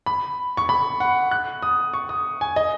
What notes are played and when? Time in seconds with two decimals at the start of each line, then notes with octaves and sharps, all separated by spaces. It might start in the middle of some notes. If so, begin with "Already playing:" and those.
0.06 B5
0.57 C#6
0.69 B5
1.00 F#5
1.31 F#6
1.62 D#6
1.94 C#6
2.09 D#6
2.41 G#5
2.56 D#5